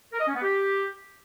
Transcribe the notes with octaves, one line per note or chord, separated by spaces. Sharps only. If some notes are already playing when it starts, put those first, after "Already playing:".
A#4
D#5
C#4
B3
G4